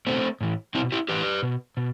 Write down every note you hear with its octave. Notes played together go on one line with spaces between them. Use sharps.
B2 A3 C4
A2 E3
B2 C4 E4
E4 G4
A2 E3 G4 B4
B2
B2